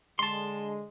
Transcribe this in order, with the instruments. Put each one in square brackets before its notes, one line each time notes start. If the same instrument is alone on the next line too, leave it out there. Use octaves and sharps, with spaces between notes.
[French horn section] D3 G#3 [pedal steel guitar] A5 C6